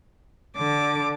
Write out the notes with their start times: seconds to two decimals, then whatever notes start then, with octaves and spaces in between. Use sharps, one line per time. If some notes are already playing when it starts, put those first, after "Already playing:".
0.56 D3 D6